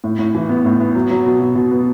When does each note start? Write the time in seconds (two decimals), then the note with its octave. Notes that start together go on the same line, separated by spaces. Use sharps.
0.04 A2
0.19 A2
0.35 E3
0.49 B3
0.65 A2
0.80 B3
0.95 F#3
1.10 F#3
1.26 B2
1.40 B2
1.55 B2
1.71 B3